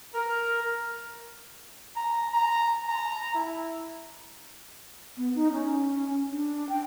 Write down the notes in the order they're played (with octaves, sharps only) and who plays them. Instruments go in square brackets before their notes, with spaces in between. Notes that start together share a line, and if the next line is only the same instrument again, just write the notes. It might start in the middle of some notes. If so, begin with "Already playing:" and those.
[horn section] A#4
[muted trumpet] A#5
A#5
A#5
E4
[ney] B3
D#4
C#4
D4
G5